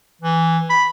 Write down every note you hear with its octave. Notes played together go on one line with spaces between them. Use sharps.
E3
B5